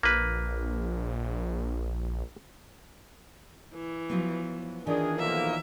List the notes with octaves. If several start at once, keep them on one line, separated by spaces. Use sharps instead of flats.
A#1 A#3 B4
E3
F3 F#3 B3
D#3 E3 D4 F4 G#4 A#4
B1 F3 A#3 E5